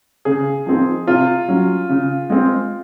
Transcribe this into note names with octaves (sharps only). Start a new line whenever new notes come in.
C#3 G#4
F3 C4 D#4
C3 F4
F#3 C#4
C#3
G#3 C4